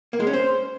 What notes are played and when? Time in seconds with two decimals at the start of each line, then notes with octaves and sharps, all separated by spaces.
0.13 A#3
0.20 G#3
0.27 C#4
0.33 C5